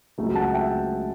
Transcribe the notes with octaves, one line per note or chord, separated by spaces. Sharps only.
C#2 C#3 F#3 A3
F#5 A5
E5 G5